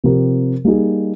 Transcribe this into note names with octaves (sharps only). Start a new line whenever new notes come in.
C3 F3 C4 G4 A#4
G3 A#3 D#4 G#4